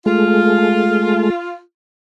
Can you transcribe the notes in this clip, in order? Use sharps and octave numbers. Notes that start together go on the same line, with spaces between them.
G#3 A3 F4